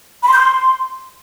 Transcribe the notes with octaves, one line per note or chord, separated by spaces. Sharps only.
B5
C6
G6
C6